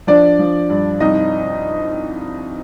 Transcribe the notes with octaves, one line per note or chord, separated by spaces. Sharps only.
F3 D4 D5
F3
G2
C2 D#4 D#5